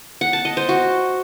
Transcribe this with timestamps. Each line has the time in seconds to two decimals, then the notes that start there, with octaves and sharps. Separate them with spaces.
0.21 F#5
0.33 A5
0.45 D#5
0.57 C5
0.69 F#4